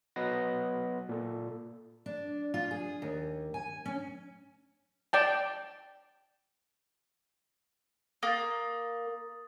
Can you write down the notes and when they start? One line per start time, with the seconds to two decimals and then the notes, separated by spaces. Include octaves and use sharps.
0.16 F#3 B3 B4 D#5 A#6
1.09 A#2 A4
2.06 D4
2.54 F4
2.71 G#4
3.02 D#2
3.54 G#5
3.86 C#4
5.13 D5 G5 A5
8.23 A#3 D#6 A6